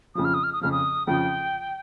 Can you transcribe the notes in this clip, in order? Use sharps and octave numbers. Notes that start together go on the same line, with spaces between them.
F2 C#3 F3 D#6
F6
D#6
F6
D#6
F2 C#3 F3 F6
D#6
F2 C#3 F3 G5